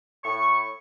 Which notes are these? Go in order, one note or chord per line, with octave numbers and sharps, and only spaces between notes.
A2 C#6